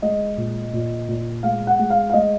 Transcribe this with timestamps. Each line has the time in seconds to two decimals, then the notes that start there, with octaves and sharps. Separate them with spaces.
0.02 G#3 D#5
0.37 A#2
0.73 A#2
1.09 A#2
1.43 G#3 F5
1.67 F#5
1.79 G#3
1.90 F5
2.10 F5
2.13 G#3 D#5